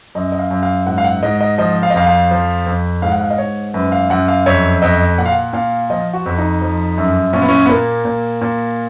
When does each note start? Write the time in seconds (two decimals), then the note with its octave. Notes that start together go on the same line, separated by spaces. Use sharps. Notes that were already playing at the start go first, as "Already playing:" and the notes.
0.15 F#2 D#5
0.32 D#5
0.39 F5
0.51 F#2
0.63 F5
0.86 G#2 F#5
0.98 F5
1.04 F#5
1.23 G#2 D#5
1.41 D#5
1.58 F3 D#5
1.83 F5
1.90 D#5
1.94 F2 F5
2.06 F5
2.31 F3
2.67 F2
3.02 G#2 F5
3.12 F#5
3.21 F5
3.30 D#5
3.38 G#2 C#5
3.74 F#2 B4
3.92 F5
4.10 F#2 F#5
4.28 F5
4.46 F2 C#5
4.82 F2 D#5
5.18 A#2 F#5
5.25 F5
5.32 F#5
5.53 A#2 F5
5.90 F3 D#5
6.13 F#4
6.26 F2
6.38 D#4
6.62 F3
6.98 F#2
7.33 A#2 C#4
7.42 B3
7.48 C#4
7.65 B3
7.69 A#2 A#3
8.05 A#2
8.41 A#2